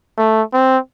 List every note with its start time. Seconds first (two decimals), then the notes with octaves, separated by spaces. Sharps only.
0.18 A3
0.53 C4